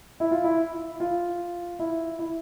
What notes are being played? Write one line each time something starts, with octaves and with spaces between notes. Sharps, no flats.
E4
F4
E4
F4
E4
E4